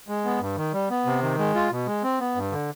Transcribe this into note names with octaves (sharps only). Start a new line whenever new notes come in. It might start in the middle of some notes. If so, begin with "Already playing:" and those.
G#3
B3
G2
D#3
G3
B3
C3
D#3
G#3
F4
B2
G#3
C4
B3
G2
D3